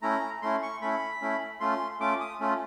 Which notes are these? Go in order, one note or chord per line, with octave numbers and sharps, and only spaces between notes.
A3 C#4 E4 A#5
A3 C#4 E4 C6
C#6
A3 C#4 E4 B5
A3 C#4 E4
A3 C#4 F4 C6
A3 C#4 F4 D6
D#6
A3 C#4 F4